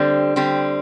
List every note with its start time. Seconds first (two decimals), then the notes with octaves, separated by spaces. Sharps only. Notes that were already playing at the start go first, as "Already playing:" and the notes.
Already playing: D3 G3 C4
0.36 D3 G3 C4